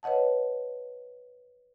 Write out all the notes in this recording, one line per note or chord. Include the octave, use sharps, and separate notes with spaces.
B4 C#5 D#5 F#5 A5